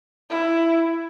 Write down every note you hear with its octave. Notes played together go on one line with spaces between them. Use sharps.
E4